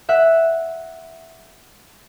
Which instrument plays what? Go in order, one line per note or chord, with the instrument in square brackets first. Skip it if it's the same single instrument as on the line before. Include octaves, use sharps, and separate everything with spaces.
[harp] E5 F#5 F#6